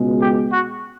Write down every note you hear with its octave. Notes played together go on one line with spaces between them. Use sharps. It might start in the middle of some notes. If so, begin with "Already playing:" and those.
Already playing: C#2 B2 G#3
G4
F#4